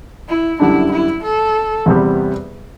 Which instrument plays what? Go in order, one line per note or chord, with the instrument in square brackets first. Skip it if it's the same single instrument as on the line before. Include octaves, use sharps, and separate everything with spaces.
[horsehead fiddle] E4
[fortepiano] F#2 D3 G3 D4 [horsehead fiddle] E4
[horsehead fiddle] E4
A4
[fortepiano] E2 C3 G3 B3